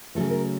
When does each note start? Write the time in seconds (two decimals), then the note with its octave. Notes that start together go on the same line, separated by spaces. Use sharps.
0.15 C#3 F#3 A3 A4
0.30 A#4